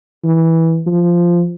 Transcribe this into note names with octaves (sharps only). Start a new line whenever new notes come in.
E3
F3